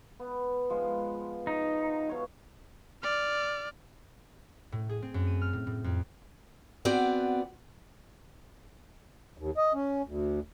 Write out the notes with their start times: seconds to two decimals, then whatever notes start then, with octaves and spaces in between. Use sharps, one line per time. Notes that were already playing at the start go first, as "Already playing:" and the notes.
0.20 B3
0.70 F3 G#3
1.47 D#4
2.07 B2 C#5 F5
3.03 D5 F6
4.72 A2
4.89 G#4
5.02 C4
5.14 F#2
5.27 D#7
5.41 F6
5.53 A2
5.67 A2
5.84 F2
6.85 B3 C4 F#4 D5
9.38 D#2
9.57 D#5
9.74 C#4
10.05 D2